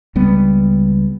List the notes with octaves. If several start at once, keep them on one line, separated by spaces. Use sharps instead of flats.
C#2 G3 B3